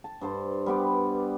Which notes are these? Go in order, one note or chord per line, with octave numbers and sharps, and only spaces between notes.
A5
G2 C5 A5
G3 B3 D5